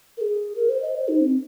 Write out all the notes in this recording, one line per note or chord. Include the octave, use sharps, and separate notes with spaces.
A#4
G#4
A#4
C5
D#5
C5
D#4
C4